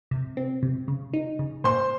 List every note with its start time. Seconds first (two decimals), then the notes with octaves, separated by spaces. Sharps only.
0.11 C3
0.37 C4
0.63 C3
0.88 C#3
1.13 D#4
1.39 C#3
1.64 A#2 C5 C6